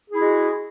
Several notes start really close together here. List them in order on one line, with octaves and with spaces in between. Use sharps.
G#4 E4 F#4 G#3